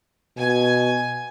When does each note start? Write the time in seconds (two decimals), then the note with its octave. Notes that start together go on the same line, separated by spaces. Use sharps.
0.38 B2 G#5